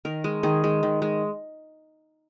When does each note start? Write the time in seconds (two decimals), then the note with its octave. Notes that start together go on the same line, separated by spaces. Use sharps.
0.05 D#3 A#4
0.24 G#3
0.43 D#3 G#4
0.64 G#3
0.83 D#3
1.02 G#3